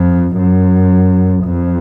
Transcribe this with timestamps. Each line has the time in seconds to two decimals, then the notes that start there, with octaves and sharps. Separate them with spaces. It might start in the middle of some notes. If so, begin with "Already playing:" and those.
Already playing: F2
0.38 F#2
1.44 F2